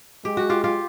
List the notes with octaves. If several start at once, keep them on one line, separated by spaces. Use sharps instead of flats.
G#3 G4
F#4
F4 G4
F4 G4